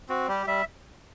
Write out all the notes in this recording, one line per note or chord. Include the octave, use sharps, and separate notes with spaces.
C4 F#4
G3 G4
G3 E5